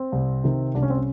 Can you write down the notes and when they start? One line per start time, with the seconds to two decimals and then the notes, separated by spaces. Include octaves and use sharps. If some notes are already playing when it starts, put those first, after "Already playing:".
Already playing: C4
0.12 C2
0.44 C3 D#3
0.75 C2 D4
0.82 C#4
0.90 C4
0.97 C#4